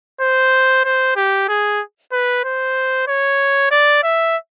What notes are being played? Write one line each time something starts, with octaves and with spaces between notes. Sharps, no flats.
C5
C5
G4
G#4
B4
C5
C#5
D5
E5